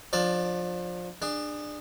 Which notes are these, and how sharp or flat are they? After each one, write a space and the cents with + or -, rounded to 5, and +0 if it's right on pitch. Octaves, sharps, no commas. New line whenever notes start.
F3 +25 D4 +25 D5 -5
D4 +20 G#4 -15